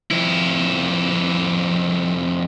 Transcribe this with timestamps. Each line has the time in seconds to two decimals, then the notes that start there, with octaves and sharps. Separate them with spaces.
0.10 F2 E4